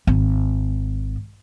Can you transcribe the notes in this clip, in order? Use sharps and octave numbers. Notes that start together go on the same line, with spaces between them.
G#1